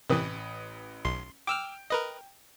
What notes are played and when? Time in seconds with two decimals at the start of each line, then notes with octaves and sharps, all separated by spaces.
0.10 A1 C3 E3 B4 D#6
1.05 B1 C6
1.47 G5 D6 E6 F6
1.90 A#4 B4 D#5